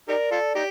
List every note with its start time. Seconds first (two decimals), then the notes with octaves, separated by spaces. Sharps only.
0.08 D#4 G4 A#4 D5
0.31 F4 A4
0.55 D#4 G4